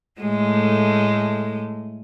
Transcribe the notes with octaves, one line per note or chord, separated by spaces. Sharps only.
A2 G#3 A3